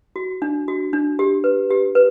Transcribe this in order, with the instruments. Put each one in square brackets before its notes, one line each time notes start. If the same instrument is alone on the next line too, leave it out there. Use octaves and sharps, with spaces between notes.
[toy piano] F#4
D4
F#4
D4
G4
B4
G4
B4